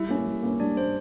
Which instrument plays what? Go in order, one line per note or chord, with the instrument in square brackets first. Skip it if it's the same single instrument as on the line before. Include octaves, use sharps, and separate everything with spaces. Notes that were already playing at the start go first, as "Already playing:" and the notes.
Already playing: [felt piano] G3 [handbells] E4 E5
[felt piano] A#3 C#4
G3
A#3 C#4
[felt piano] G3 [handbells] D4 D5
[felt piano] A#3 C#4 [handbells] C5